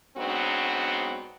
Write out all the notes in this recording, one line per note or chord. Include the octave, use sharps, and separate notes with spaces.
G#2 F#3 B3 C4 D4 F#4